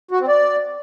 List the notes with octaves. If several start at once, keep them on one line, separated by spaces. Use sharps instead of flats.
F#4
C4
D5